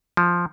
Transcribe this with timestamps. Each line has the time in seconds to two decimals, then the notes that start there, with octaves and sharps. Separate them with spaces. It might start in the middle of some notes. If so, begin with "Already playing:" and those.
0.17 F3